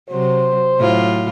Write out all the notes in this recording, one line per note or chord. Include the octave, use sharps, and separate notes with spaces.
C3 F#3 C5
A2 F#3 F4